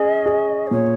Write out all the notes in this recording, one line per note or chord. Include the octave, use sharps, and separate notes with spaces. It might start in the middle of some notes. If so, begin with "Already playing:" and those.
Already playing: C#4 G#4 D#5
G#4
C5
A#2 C#5